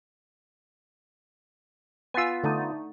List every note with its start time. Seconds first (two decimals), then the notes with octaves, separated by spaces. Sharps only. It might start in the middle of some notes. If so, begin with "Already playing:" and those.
2.14 B3 F4 G#5 E6
2.43 D3 A3 D#4